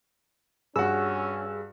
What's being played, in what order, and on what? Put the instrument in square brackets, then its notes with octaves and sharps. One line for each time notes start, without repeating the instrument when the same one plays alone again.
[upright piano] G2 F#4 [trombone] C#4 [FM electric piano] G#4 E6